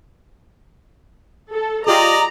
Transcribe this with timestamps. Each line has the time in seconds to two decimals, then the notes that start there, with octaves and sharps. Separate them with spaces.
1.52 A4
1.87 F4 G4 G#4 D5 D#5 A#5